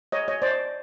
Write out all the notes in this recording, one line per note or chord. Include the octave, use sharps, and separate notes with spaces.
C#5 D#5
C#5 D#5
C5 D5